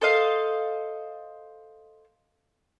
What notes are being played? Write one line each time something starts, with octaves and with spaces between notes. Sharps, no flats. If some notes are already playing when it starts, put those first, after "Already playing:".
A4 C5 D#5 F5